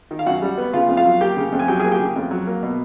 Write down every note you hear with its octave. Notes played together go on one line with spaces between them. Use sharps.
D#3
F5
F#2 F#4 F#5
G3
B3
C#3 F4 F5
F2
F4 F5
F#3
A#3 G4 G5
C#3
F2
G#5
F#3 G4 G5
A#3 G#4 G#5
G4 G5
C#3
F2
F#3
A#3
B2